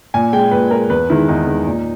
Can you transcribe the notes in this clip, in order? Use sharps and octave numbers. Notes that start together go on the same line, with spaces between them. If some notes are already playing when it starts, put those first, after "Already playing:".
A#2 G#5
G#3 G5
A#2 B4
G#3 A#4
E2 B4
D#3 G#3 E4
E2 D#4
D#3 G#3
A#2